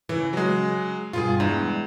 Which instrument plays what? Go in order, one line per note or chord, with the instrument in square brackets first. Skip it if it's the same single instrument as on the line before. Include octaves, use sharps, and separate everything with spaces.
[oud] C#3 [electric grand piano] E3
[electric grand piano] F#3 G#3
[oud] G2 B2 [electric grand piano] F4 G#4
[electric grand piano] E2 [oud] G#3 D4 E4